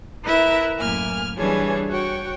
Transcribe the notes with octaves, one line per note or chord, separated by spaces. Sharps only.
E4 A#4 B4 E5 A#5
F#2 A2 A#3 G#5 F6
E3 G3 D4 G#4 A4 C#5
F#4 C#5 G5